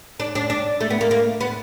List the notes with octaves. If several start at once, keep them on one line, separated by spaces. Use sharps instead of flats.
D4
D4
D4
A3
B3
A#3
A#3
B3